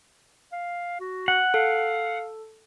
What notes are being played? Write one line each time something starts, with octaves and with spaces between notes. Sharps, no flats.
F5
F#4
F#5
A4 F5